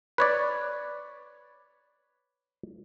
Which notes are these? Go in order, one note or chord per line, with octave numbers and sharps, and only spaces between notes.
B4 C#5 D5